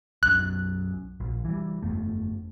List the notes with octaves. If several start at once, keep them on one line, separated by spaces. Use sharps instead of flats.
B1 F#2 F#6
A#1
E3 G3
G1 F2 A3